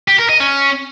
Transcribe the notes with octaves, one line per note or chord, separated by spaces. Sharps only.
G4
A#4
D#5
C#4